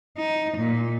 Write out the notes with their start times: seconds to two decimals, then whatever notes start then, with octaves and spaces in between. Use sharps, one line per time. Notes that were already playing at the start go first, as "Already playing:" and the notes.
0.18 D#4
0.58 A#2